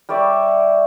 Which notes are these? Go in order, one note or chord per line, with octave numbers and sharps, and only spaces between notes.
G3 C#5 D5 E5